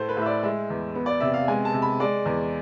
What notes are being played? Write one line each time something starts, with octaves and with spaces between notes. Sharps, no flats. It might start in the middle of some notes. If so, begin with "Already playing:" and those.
Already playing: A2 A3 C5
B4
A2
E5
D5
G#3 E5
E2
B3
D5
C3 E5
F5
G#3 G#5
A5
C3
B5
G#3 D5
E2